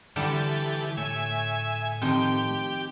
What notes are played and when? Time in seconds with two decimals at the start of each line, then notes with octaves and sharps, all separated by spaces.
0.16 D3 E3 G3 G4 A4
0.97 A2 A3 C#5 E5 G#5
2.02 D#3 F3 C4 G4 G5